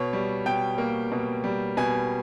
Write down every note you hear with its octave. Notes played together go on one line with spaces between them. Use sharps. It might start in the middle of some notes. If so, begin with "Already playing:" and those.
Already playing: B2 C#5
G3
B2 G5
A#3
B2
G3
B2 G#5